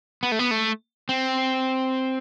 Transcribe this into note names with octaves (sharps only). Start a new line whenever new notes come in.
B3
A3
B3
A3
C4